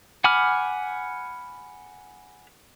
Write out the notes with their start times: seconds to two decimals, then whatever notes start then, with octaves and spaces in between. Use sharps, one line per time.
0.24 F#5 G#5 B5 D6 F6